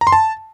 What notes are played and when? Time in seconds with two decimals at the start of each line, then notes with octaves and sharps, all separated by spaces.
0.01 A#5
0.07 C6
0.12 A5